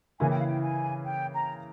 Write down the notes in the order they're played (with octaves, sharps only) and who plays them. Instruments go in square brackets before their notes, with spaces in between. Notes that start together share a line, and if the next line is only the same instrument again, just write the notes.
[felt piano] C#3 E3 A#3 E4 [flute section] G#5
[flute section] G5
F5
G5
G#5
G5
A#5